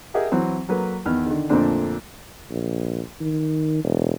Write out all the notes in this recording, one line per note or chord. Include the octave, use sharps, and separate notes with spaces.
G4 G#4 A#4 D#5 E5 F#5
E3 F#3 C4
F#3 A#3 A4 B4
E2 D#3 B3 F6
D3 D#3
F2 A#2 D3 A3 C4 D4
A#1
D#3
E1